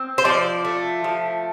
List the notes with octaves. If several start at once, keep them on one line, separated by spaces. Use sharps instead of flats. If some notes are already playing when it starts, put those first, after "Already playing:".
Already playing: C4
C5
F3 D5
A3
F3